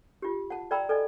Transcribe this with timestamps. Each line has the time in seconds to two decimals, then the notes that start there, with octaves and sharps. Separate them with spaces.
0.22 F4 G4
0.50 F#5 A5
0.71 D5 E5 G5 A#5 B5 E6
0.89 A4 D5 D#5 G#5